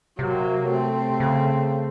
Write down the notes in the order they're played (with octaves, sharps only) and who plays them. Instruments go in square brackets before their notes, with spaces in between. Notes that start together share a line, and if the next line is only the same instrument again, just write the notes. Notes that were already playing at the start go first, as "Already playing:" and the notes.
[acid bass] C3 [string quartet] F#3 A#3
[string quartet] A3 C4
[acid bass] C#3